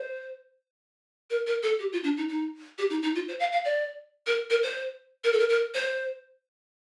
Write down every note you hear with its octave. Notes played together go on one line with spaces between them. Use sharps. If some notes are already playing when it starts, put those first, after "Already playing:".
Already playing: C5
A#4
A#4
A4
G4
F4
D4
D#4
D#4
G4
D#4
D#4
F4
C5
F5
F5
D5
A#4
A#4
C5
A#4
A4
A#4
A#4
C5